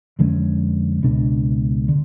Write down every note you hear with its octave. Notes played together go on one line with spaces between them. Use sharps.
F2 D3 G#3 C#4
C#2 B2 G#3 D4
D3